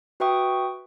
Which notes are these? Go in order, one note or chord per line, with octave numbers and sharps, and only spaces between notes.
F#4 B4 E5 G5 C#6 D#6